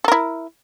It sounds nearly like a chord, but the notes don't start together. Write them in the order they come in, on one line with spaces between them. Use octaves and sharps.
A4 A#4 E4